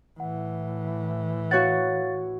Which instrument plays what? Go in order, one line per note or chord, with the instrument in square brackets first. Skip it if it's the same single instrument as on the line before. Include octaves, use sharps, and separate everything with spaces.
[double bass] A2 E3 [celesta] F#5
[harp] F#4 C#5 F#5 [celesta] F5 A6